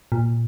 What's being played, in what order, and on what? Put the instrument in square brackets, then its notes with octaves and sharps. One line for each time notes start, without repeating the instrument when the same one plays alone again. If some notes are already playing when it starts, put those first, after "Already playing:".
[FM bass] A#2